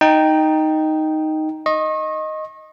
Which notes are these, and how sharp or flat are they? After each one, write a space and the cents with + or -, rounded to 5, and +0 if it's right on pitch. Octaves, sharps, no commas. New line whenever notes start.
D#4 +0 G5 +0
D#5 +0 C#6 -40